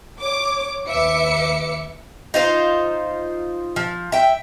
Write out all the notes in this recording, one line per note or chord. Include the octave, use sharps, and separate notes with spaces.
C#5 D6
D#2 B4 E5 D6 C#7
D#4 F4 C5
F3
E5 G5